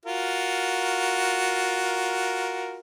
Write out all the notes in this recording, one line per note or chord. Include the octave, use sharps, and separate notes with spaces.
F4 F#4 A#4